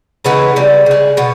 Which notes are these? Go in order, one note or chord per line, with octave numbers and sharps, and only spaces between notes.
C#3 E3 G#3 B3 D#4
C#3 G3
C#3 G#3
B2 B3